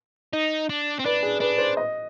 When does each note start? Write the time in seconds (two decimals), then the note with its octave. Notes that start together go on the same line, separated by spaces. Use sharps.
0.33 D#4
0.70 D4
0.99 C4
1.05 D4 B4
1.23 G#4
1.41 D4 B4
1.58 C5
1.77 D#5